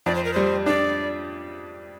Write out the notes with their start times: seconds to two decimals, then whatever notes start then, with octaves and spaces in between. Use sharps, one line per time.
0.06 F2 D5
0.15 C5
0.25 A#4
0.33 G3 C5
0.66 D4 D5